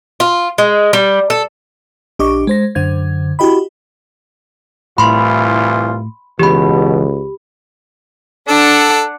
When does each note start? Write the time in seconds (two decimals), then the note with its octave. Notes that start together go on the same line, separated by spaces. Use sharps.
0.20 F4
0.58 G#3
0.93 G3
1.30 A4
2.19 A#1 D4 G4 D#5 C#6 D6
2.47 G#3 C5 A#6
2.75 F#2 D3 C5 G#6
3.39 E4 F#4 G4 D#5 B5
4.98 C2 A2 E3 F4 B5 C6
6.39 C#2 B2 E3 G4 B5
8.48 D4 A4 F#5